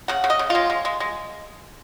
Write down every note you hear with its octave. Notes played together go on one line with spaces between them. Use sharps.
C#3 F#5
C#3
D#5
C#3
G#3 F4
G#3
G#3
G#3